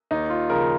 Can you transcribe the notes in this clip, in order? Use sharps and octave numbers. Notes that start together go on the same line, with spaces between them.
D#2 D#4
F4
C#3 F3 A#4